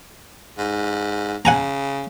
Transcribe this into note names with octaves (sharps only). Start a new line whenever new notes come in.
G#2
C#3 F#5 G#5 A#5